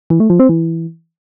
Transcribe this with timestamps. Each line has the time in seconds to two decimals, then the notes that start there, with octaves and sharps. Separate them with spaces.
0.10 E3
0.20 A3
0.30 F3
0.40 C4
0.49 E3